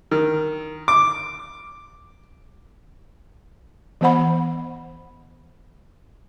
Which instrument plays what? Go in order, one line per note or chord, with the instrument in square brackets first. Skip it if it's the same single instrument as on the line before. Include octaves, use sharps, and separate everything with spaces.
[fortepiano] D#3
D6
[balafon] E3 B3 C5 F#5 B5